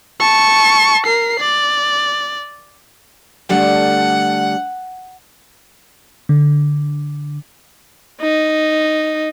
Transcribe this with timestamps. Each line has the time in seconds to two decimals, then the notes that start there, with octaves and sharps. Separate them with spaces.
0.20 A5 C#6
1.06 A#4 C7
1.40 D5
3.49 D3 G3 A3 F#5
6.29 D3
8.21 D#4